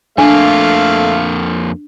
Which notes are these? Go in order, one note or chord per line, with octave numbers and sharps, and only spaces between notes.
F2 A3 A#3 D4 F4 F5 G#5